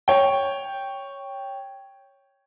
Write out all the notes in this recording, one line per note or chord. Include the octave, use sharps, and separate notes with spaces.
C#5 G5